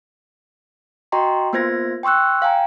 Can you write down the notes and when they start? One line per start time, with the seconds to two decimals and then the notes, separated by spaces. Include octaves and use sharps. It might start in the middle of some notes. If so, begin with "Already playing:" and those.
1.12 F#4 D#5 G5 A#5 C6 C#6
1.53 A#3 B3 F4 C5 G#6 A#6
2.03 G5 C6 C#6 E6 F#6
2.42 F5 G5 G#5 A#5